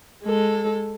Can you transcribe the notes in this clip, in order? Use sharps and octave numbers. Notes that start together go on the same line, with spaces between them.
G#3 A4